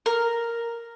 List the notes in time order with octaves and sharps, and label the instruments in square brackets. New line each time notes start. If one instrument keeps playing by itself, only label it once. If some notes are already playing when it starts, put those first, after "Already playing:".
[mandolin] A#4